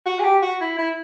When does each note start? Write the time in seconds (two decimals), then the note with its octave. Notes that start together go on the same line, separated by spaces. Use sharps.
0.06 F#4
0.19 G#4
0.24 G4
0.42 F#4
0.61 E4
0.78 E4